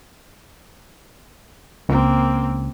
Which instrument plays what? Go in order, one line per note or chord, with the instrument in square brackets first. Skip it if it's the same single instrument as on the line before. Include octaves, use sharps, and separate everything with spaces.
[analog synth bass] C#2 [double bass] A#3 C4